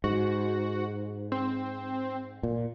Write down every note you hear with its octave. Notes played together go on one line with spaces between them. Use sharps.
G#2 F#4
C4
A#2